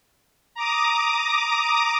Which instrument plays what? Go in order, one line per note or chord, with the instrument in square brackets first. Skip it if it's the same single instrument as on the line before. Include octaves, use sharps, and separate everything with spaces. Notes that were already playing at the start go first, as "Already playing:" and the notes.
[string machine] A#5 D6 D#6